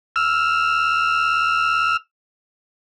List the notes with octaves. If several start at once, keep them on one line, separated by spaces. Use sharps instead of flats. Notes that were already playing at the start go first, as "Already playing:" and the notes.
E6 F6